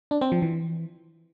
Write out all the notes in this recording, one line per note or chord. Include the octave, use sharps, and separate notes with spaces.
D4
C4
F3
E3